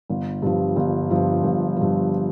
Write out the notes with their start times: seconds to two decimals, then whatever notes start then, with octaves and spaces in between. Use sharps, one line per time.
0.10 G1
0.42 G2 F3
0.76 G1
1.10 G2 F3
1.44 G1
1.77 G2 F3